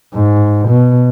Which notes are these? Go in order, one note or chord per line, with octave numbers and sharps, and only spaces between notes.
G#2
B2